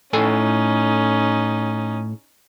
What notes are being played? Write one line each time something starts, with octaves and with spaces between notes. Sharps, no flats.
A2 C#4 D#4 A4 G#5